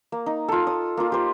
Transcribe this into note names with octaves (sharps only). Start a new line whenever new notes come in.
A#3
D#4
F4 A4
D#6
A#3 F4
G4 C5